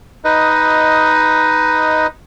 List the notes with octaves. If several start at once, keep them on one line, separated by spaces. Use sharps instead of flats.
D#4 B4 D#5